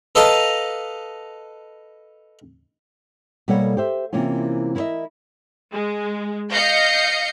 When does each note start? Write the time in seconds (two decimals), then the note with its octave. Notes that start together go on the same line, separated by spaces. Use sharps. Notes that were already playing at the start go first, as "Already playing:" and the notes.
0.15 A4 B4 D#5 F5 A5 A#5
3.48 B2 G3 A#3 A4 C#5 F#5
3.77 G4 C5 E5
4.13 C3 E3 A#3 C#4 F4
4.76 E4 A#4 C5 D#5 E5
5.72 G#3
6.52 D#5 F5 G6 C7 C#7